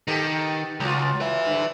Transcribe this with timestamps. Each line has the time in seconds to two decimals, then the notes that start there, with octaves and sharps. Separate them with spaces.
0.08 D#3 B3 G4 A4
0.80 C#2 F#3 F4
1.20 B4 E5
1.45 G2 D3